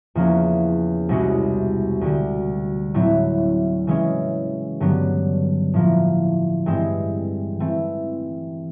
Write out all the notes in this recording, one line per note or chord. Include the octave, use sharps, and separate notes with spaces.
E2 C#3 F3 A#3 C#4
C2 B2 G#3 C#4 F#4
D2 D3 G3
A2 F#3 A3 C4 E4
C#3 E3 G#3 C#4
G2 D3 F#3 B3
A2 F3 A#3
G2 E3 G#3 C4
E3 A3 C4